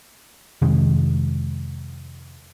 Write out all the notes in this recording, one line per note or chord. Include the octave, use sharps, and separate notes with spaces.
F2 C3 D#3 G#3